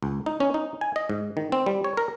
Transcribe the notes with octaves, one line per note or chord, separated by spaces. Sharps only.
C#2
D#4
C#4
D#4
G#5
D#5
G#2
D#3
C4
G3
C#5
A#4